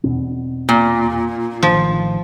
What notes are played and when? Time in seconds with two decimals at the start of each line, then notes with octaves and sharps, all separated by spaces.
0.04 E2 B2 C4
0.69 A#2
1.63 A1 D#3 F3